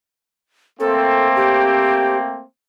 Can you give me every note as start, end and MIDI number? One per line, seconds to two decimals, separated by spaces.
0.80 2.43 57
0.80 2.43 58
0.80 2.43 60
0.80 1.28 69
1.36 2.17 67